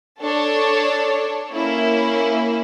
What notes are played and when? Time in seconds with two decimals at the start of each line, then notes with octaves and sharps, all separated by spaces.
0.21 D4 A4 C#5
1.52 A#3 C#4 E4